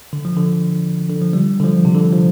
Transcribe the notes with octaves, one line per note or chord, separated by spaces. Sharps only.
D3
F3
D3
D3
F3
G3
D3
F3
C3
D3
F3